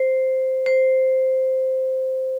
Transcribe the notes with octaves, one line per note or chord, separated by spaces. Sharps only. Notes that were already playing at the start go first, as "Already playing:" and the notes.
Already playing: C5
C5